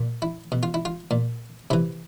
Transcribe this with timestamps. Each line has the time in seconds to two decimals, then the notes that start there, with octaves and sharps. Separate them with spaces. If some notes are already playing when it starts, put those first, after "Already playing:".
Already playing: A#2
0.22 E4
0.52 B2
0.63 F4
0.74 E4
0.85 F4
1.11 A#2
1.70 C3 E3 E4